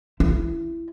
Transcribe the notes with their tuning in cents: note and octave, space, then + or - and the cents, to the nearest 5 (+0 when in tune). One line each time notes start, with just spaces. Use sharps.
E4 +15